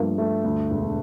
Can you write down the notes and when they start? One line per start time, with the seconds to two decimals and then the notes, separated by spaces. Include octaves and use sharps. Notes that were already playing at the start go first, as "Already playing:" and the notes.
Already playing: G2 F3 A3 A#3
0.18 A3
0.44 D2
0.71 E1